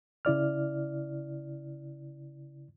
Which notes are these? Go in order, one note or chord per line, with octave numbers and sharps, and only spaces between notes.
C#3 E4 D5 F6